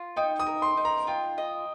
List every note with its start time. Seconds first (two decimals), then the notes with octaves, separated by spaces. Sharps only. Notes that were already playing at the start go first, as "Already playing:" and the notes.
Already playing: F4
0.17 D#4 G5
0.40 D#6
0.47 A#4
0.62 C6
0.77 D#4
0.85 A#5
1.07 F4 G5
1.38 D#5